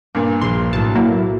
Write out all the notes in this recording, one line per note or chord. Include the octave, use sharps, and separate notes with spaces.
G2 A#2 D6
A#1 C6 F#6
B1 A2 A5
F#3 A#3 E4